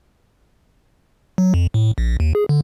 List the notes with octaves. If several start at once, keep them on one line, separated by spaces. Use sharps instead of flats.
F#3
F2
A2
A#1
D#2
G#4
D3